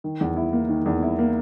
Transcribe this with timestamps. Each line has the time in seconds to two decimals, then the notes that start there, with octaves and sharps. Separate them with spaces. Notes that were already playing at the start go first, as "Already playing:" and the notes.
0.04 D#3
0.21 E2
0.36 E4
0.53 A#3
0.69 D#3
0.86 E2
1.03 E4
1.19 A#3